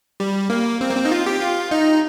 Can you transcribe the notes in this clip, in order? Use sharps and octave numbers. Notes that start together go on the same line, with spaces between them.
G3
A#3
C4
A#3
C4
D#4
F4
G4
F4
D#4